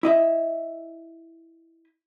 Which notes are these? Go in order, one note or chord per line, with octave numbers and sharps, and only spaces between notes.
E4 D#5 E5